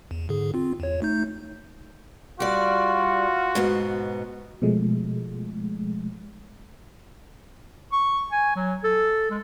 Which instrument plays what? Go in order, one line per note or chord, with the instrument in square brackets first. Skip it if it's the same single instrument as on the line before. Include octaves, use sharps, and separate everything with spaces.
[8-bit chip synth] E2
G#2 D3 G#4
C4 F4
E2 C#5
A3 D#4 G6
[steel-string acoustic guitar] G3 D5 [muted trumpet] F4 [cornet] F#4
[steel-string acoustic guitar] G#2 B2 B3
[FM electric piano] B2 F3 G#3 A3
[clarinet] C#6
G#5
F#3
A4
G#3